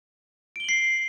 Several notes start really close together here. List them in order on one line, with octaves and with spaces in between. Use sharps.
D7 G7 F#7 C7